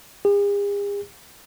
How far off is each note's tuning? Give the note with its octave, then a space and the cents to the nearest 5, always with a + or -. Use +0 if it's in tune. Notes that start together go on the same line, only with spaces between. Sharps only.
G#4 -45